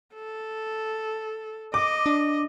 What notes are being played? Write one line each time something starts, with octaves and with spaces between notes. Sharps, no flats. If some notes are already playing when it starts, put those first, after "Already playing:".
A4
D#5 D6
D4